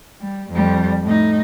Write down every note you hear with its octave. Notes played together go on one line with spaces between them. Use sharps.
G3
F2 G3
A2 D#4